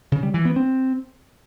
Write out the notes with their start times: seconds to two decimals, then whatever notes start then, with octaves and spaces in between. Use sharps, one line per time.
0.12 C#3
0.23 G3
0.34 E3
0.45 B3
0.56 C4